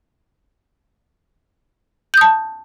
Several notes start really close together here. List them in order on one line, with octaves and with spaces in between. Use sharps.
G6 D#6 A5